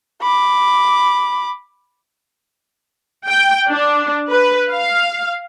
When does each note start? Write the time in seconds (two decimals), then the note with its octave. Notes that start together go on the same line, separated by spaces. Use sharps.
0.21 B5 D6
3.27 G5
3.70 D4
4.30 B4
4.73 F5